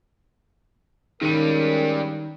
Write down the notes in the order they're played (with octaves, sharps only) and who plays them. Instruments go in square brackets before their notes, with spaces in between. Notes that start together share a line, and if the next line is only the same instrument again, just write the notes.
[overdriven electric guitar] G2 G3 [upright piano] D#3 D#7 [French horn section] G#3 C#4 [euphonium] A#4